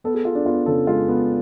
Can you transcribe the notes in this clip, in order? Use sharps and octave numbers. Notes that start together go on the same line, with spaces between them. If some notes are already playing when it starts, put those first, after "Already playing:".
B3 A4
G#4
B3 F4
D4
B3 F4
C#3 A4
G#3 F4
B3